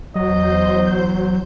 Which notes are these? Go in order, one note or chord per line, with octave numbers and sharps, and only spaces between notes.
E2 F#3 C5 D#5 G6